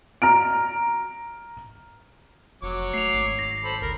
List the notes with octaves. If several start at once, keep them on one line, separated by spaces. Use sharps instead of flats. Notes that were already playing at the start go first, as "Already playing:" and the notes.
A#5 F6 D7
F1 F#3 C#5 D6
A3 C7 F7
G#1
A#6
A4 C5 B5
D2 A#4